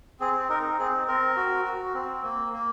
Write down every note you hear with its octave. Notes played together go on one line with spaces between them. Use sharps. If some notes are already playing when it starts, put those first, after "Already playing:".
C4 G#4
D#4 A#4
C4 G#4
C4 A#4
F#4
F#4
C4
A#3
A#3